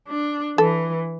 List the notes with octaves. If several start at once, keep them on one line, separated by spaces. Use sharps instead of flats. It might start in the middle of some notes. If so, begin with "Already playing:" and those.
D4
E3 A4